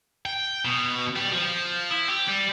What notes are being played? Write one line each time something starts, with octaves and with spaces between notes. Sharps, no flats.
G5
B2
G3
F3
E4
G4
G3